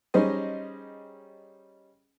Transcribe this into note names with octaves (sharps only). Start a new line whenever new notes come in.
G3 C#4 D#4 G#4 C5 D#5